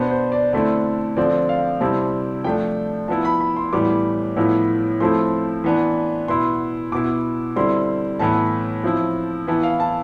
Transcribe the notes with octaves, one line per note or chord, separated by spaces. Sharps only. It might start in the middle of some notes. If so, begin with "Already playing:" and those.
Already playing: B2 B3 D4 C5
C5
D5
D3 A3 C4 E4 D5
D3 F3 C4 D5
F5
C3 G3 C4 E4 A5
F3 A3 D4 G5
F3 B3 E4 A5
B5
B5
C6
A2 E3 G3 B3 D6
A2 F3 B3 E4
F3 A3 C4 E4 C6
E3 B3 D4
B2 B3 E4 C6
B2 B3 E4 D6
D3 G3 C4 E4 C6
A2 E3 B3 E4 A5
F3 C4 E4
E3 B3 E4 A5
F5
A5